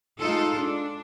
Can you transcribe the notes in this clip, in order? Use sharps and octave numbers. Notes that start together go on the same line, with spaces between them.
G#3 D#4 F4 A4
D4